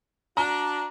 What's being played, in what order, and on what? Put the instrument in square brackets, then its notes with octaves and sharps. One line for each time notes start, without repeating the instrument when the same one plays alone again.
[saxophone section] D4 F#4 [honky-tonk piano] A#5